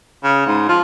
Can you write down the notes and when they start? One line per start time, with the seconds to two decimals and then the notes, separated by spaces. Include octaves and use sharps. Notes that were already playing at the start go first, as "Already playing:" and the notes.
0.24 C#3
0.47 G#2
0.69 F3